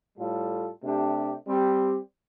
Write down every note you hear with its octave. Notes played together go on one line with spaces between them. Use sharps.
A2 G3 F4 A4
C3 A3 D4 G4
G3 C4 G4